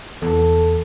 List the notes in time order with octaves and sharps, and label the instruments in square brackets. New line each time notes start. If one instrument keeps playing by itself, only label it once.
[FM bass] E2 [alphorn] A4